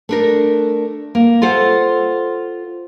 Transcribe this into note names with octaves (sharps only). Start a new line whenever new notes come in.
A3 D4 A#4
A#3
F4 A4 C5 F#5